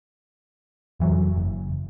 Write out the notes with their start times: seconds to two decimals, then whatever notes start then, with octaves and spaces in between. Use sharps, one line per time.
1.00 F1 E3 F#3
1.36 F#1